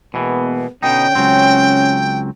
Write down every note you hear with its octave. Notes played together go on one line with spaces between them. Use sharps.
B2 E3 G#3 A#3 B3
B2 D3 C#4 D#4 G5
C#2 F#3 C4 C#4